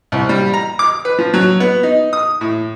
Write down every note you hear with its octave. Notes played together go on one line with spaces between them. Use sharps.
C2
G3
A#5
D6
B4
F3
F#3
B3
D#4
D#6
A2